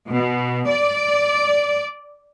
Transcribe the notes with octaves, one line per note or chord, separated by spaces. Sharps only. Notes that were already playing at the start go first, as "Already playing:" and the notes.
B2
D5